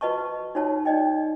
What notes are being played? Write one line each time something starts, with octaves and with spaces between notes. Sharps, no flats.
F#4 B4 D#5 A5 C#6
D#4 F#4 C#5 A5
D#4 D5 D#5 G5